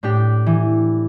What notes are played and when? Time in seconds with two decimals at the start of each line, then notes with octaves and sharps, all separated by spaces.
0.03 A2 D4 G4
0.46 E3